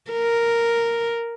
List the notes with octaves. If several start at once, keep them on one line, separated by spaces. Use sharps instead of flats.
A#4